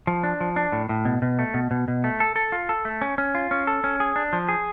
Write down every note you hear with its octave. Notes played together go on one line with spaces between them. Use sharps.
F3
D4
F3
D4
A2
A2
B2
B2
A3
B2
B2
B2
A3
A4
A4
F4
A4
A3
C#4
C#4
F4
C#4
A4
C#4
G#4
D4
F3
G#4